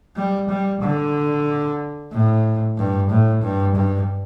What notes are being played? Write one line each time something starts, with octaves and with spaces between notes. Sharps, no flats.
G3
G3
D3
A2
G2
A2
G2
G2